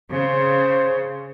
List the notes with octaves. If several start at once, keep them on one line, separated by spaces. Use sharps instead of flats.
C#3 C5